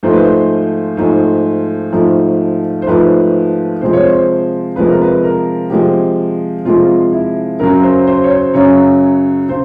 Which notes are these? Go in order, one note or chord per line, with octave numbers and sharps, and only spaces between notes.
G#2 F3 A3 C5
B4
C5
G#2 F3 A3
G#2 F3 A3
C5
G#2 F3 A3 B4
C3 F3 G#3 C5
C#5
C5
C3 F3 G#3 B4
A#4
B4
A#4
C3 F3 G#3 G4
C3 F3 G#3 F4
E4
F#2 C#3 F#3 A#4
C5
C5
C#5
C5
F#2 C#3 F#3 C#5
C#3 C5